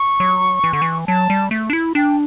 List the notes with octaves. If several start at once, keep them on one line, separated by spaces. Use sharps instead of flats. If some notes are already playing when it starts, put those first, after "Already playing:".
Already playing: C#6
F#3
E3
D3
E3
F#3 A5
G3
A3
D4
E4
D4 G5